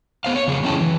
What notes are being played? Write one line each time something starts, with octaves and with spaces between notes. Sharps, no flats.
B3 C5 F5
C#5
F2 C#3 G#4
F#2 E3 C#4 E4 G5 A5
E3